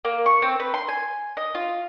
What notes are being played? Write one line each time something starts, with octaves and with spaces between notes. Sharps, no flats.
A#3
C#6
C4
B4
C6
G#5
D#5
F4